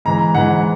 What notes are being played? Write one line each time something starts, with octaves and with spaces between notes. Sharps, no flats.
G#2 E3 A#5
G#2 E3 F#5